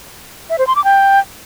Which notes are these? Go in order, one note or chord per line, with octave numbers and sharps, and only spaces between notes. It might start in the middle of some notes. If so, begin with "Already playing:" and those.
E5
C5
C6
D6
G5